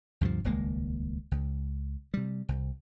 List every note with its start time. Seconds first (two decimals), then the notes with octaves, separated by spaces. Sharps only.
0.21 D2 G2 C3 F3
0.44 D#1 C#2 G#3 A#3
1.31 C#2
2.14 C3 G3
2.49 C2